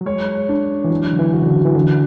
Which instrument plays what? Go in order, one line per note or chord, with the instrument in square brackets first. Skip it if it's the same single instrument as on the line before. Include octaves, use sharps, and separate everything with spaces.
[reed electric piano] F#3
[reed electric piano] G#3 [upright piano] C#5
[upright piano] D4
[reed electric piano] E3
[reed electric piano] F#3 [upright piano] D4
[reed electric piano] D3
E3
[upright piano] F#4
[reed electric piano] C#3
D3
E3
[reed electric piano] D3 [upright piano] D4